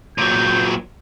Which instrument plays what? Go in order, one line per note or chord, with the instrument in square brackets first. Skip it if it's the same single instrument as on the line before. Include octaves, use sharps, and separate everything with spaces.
[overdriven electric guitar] A#2 F#3 [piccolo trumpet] G6